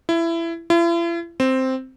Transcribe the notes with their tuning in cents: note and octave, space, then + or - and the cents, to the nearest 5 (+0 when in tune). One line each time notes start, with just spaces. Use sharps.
E4 +20
E4 +45
C4 +0